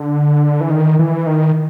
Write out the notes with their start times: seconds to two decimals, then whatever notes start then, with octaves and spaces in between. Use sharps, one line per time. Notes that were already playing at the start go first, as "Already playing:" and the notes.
Already playing: D3
0.61 E3
0.70 D#3
0.99 E3
1.27 D#3